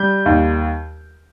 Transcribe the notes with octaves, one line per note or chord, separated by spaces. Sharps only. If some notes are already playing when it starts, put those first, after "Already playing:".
Already playing: G3 G6
D#2